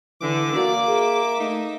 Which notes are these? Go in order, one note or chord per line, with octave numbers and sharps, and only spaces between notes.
D3 E3 D6
A#3 F#4 D5
G#4 E5
A3 D#4